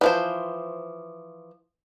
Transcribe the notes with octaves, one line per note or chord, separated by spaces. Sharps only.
E3 F3 C5